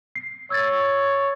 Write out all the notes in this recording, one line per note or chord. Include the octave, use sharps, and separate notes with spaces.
C7
C#5 E6 G#6 A6